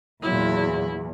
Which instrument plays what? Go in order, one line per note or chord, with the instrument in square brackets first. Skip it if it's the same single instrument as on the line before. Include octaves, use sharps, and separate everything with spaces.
[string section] E2 [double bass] A#2 F#3 [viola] E4